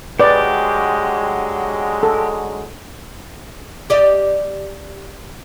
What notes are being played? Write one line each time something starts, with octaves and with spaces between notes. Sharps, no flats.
D3 F#3 G#3 G4 B4 D5
A4
G4 D5 D#5